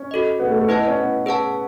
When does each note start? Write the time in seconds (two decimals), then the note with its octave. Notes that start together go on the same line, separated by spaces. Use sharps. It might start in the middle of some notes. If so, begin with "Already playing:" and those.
Already playing: C#4
0.11 F#4 A4 D#5
0.40 B3
0.49 A3
0.59 A3
0.69 B3 E4 B4 D#5 A5
0.87 C#4
0.97 B3
1.26 G#4 B4 F#5 A5